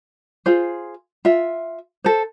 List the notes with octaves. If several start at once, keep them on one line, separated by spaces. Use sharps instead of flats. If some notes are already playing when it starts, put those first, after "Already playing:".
F4 G#4 C5
F4 E5
A4 C5